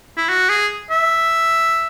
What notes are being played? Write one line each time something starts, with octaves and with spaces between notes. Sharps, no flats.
E4
F#4
G#4
E5